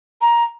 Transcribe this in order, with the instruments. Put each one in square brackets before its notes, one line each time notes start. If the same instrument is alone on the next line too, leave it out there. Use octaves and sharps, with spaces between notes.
[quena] A#5